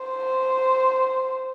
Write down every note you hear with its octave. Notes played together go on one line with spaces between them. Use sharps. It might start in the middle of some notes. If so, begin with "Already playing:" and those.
Already playing: C5